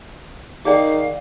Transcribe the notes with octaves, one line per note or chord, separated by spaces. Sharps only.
D#3 G#4 D5 F5 G5